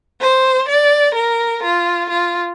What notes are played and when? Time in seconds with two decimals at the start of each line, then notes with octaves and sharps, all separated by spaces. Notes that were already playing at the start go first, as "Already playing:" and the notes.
0.21 C5
0.68 D5
1.15 A#4
1.63 F4
2.09 F4